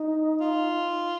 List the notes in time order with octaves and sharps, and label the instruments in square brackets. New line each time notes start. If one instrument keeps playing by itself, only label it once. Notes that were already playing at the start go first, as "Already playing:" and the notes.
Already playing: [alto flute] D#4
[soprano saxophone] F4